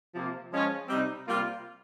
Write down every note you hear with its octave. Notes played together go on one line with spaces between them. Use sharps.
C3 F3 A#3
F3 G#3 C#4 F4
C3 G3 C4 D#4
C3 G3 A#3 F4